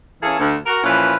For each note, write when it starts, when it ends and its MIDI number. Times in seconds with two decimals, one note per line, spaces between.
0.23 0.37 52
0.23 0.37 58
0.23 0.37 61
0.23 0.37 68
0.23 0.37 69
0.39 0.55 38
0.66 0.82 66
0.66 0.82 70
0.84 1.14 46
0.84 1.14 52
0.84 1.14 53
0.84 1.14 61
0.84 1.14 65
0.84 1.14 71